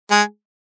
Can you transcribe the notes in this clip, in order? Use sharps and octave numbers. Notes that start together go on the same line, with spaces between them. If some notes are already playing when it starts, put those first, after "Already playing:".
G#3 G#4